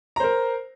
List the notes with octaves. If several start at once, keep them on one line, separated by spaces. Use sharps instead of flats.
A#4 C5 A#5